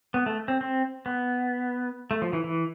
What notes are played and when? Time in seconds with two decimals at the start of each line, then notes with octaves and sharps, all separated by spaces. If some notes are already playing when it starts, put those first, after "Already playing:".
0.14 B3
0.26 A3
0.48 C4
0.61 C4
1.06 B3
2.11 A3
2.22 F3
2.33 E3
2.44 E3